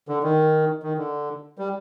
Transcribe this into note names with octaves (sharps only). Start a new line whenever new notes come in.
D3
D#3
D#3
D3
G3